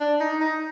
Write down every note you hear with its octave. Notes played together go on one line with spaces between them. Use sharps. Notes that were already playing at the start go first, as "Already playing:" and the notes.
D4
D#4
D#4